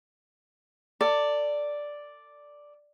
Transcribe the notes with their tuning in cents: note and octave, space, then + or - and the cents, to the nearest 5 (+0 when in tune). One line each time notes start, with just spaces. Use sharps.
A4 +30 D5 +0